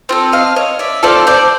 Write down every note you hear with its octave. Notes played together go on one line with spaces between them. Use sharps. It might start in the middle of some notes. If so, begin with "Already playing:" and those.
C4 F4 A4
D#5 F5
C#5 D#5
D5 E5
C4 F4 A4 C5 D5
C5 D5